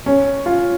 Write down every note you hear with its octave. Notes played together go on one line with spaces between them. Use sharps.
C#4
F4